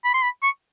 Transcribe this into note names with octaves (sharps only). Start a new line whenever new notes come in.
B5
C6
B5
C#6